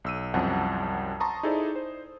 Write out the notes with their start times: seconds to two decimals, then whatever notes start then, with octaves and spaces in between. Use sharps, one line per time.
0.04 B1 E6 D#7
0.34 C2 F#2 F3 C4 F#5 A5
1.20 A5 A#5 C6 C#6 D#6
1.43 D#4 E4 G#4 A4 C5 D5
1.76 C5